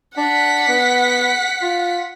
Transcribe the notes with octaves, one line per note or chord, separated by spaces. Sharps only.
D4 F#5 B6
B3
F4